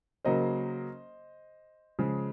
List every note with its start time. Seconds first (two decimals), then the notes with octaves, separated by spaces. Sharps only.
0.25 C#3 F#3 A#3 C5 D#5
1.99 C#3 F3 G#3